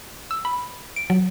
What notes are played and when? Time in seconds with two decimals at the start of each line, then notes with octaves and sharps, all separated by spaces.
0.31 E6
0.45 B5
0.96 D7
1.10 F#3